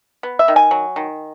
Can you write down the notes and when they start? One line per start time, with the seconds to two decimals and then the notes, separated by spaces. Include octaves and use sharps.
0.23 B3
0.39 E5
0.48 D#3
0.56 G#5
0.71 F#3
0.96 D#3